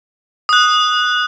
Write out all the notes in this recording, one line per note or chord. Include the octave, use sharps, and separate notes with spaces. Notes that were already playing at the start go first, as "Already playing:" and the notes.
D#6 F#6